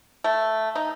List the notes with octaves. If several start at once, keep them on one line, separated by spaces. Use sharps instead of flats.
A3
D#4